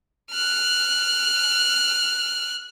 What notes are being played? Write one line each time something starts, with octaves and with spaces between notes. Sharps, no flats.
F6 F#6